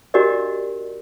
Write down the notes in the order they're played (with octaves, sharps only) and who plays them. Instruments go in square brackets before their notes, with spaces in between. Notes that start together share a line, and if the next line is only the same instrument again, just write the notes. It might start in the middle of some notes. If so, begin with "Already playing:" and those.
[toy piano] D4 F#4 G4 A#4 D5 D#5